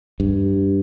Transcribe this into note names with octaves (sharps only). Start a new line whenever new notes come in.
G2